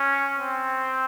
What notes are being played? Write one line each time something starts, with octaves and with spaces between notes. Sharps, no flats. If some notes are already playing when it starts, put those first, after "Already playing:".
Already playing: C#4
C4